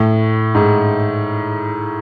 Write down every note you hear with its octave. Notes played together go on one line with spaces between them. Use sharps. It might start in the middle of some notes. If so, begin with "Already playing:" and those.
Already playing: A2
G#2